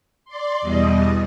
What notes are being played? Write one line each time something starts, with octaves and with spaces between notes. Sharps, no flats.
D5 C6
E2 B2 G3 D#5